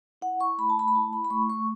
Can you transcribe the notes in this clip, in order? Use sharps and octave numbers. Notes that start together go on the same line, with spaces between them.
E4 F#5
E4 C#6
A3 B5
A5
A3 B5
B5
E4 A5
E4 B5
B5
A3 C#6
A3 C#6